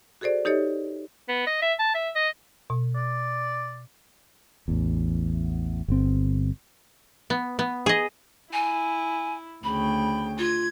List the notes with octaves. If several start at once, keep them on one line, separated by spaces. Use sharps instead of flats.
F#4 G#4 A4 C5 D5
D#4 G4 A4 C#5 D#5
B3
D#5
E5
A5
E5
D#5
B2
D5
A1 E2
G1 C4
B3
B3
G#4 D#5
E4 G#5
D2 C#3 G5 B5
F4 G#6